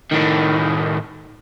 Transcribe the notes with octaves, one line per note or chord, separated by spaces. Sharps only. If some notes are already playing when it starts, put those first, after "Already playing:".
A2 D#3